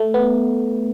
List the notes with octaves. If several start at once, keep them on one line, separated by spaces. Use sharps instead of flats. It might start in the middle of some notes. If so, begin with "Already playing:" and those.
Already playing: A3
B3